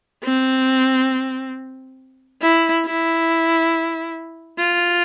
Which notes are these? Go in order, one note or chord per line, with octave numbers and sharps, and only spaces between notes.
C4
E4
E4
F4